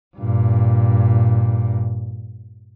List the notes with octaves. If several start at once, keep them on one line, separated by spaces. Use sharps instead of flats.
G2 A#2